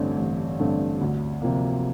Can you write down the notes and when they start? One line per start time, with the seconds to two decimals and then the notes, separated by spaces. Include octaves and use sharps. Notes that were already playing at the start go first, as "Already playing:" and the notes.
Already playing: A1 G2 D3 A3 C4
0.18 A1
0.59 G2 D3 A3 C4
1.01 D2
1.42 C3 F3 A#3